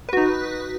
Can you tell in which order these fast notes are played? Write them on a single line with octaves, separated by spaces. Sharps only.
B4 F#4 D#4